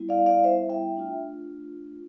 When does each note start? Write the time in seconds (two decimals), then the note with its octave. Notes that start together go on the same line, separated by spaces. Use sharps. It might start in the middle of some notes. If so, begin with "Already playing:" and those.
Already playing: G3 B3 E4
0.09 D5 F5
0.26 D5 F5
0.44 C5 E5
0.69 E5 G5
0.96 A3 D4 F4